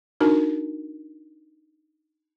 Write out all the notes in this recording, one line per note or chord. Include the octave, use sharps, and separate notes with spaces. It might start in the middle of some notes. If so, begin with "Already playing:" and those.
D4 D#4 F#4 A#4